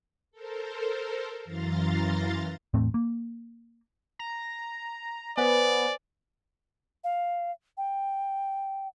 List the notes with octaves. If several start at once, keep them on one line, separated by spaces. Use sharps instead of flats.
A4 A#4 C5
F#2 E3 F5 A#5 C6 A6
E2 A2 A3 C4
A#3
A#5
B3 B4 C5 D5 G#5
F5
G5